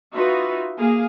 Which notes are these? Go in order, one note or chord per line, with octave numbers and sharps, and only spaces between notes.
D#4 F4 F#4 B4 E5
A#3 G#4 F5